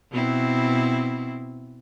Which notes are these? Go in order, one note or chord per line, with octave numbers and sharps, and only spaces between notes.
B2 C4 E4